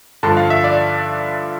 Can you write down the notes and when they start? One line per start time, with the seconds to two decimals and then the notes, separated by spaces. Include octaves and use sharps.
0.23 G2 D3 F3 A5
0.37 F5
0.50 E5
0.64 D5